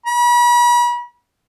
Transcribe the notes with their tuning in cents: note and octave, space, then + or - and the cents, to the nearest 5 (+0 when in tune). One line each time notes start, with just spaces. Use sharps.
B5 -40